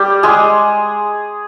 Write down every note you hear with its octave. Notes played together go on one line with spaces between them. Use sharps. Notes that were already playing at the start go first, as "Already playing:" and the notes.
Already playing: G3 G4
G#3 G#4